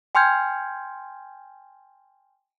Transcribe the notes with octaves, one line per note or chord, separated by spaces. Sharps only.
G5 G#5 C6 F6 G6 G#6